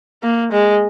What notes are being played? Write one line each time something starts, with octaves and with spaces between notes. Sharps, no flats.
A#3
G#3